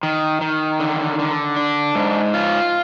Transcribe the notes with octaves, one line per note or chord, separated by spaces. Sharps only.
D#3
D#3
D3
D3
D4
G#2
F4